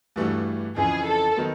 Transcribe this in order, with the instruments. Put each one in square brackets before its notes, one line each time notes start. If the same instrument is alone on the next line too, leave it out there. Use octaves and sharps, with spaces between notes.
[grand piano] G2 E3 A3 D4 F#4
[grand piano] F2 C#3 E3 [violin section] G#4
[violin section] A4
[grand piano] D#3 F#3 B3